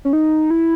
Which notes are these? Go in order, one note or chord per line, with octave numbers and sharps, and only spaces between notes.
C#4
D#4
E4